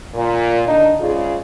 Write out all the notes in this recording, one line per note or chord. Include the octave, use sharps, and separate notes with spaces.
A#2
D3 D4 D#4
G#2 C#3 F4 G#4 D5